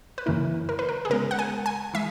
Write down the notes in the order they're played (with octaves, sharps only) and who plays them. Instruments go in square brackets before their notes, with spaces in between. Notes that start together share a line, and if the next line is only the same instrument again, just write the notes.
[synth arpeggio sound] B4
[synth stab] F#2 C#3 E3 A#3 E4 [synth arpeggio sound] A#4
[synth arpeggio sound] A#4
B4
A#4
G#4
[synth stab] C#3 G#3 B3 [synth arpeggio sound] A#4
[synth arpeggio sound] F#5
G#5
G#5
[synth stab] E3 G#3 [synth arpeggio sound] E5